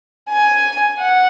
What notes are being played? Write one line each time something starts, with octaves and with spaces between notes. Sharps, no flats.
G#5
F#5